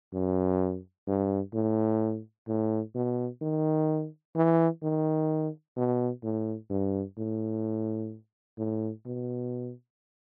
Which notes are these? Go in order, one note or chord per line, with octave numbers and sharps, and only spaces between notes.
F#2
G2
A2
A2
B2
D#3
E3
D#3
B2
A2
G2
A2
A2
B2